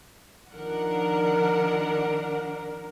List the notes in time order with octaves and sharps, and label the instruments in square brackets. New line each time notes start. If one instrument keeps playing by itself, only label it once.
[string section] D#3 F3 F#5 [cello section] D4 A#4